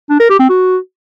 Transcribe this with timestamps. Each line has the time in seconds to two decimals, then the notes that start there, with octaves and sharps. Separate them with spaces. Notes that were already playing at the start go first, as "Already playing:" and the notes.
0.10 D4
0.20 A#4
0.30 G4
0.39 C4
0.49 F#4